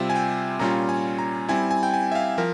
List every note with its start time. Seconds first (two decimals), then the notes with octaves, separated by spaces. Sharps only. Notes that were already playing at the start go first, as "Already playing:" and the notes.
Already playing: C3 G3 C4 F4 E5
0.10 G#5
0.15 G5
0.59 A#2 G3 C#4 F4 A#5
0.89 G#5
1.19 A#5
1.49 G3 C4 E4 G#5
1.71 G#5
1.83 G5
1.94 G#5
2.12 E5
2.15 F5
2.38 F3 A#4